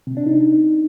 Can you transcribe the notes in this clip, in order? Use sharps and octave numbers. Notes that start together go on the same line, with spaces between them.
C3
D4
D#4